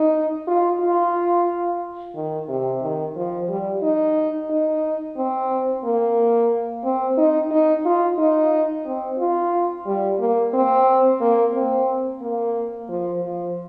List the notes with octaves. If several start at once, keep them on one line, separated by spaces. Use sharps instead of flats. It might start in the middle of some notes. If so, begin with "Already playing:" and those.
Already playing: D#4
F4
F4
D#3
C3
D#3
F3
G3
D#4
D#4
C4
A#3
C4
D#4
D#4
F4
D#4
C4
F4
G3
A#3
C4
A#3
C4
A#3
F3
F3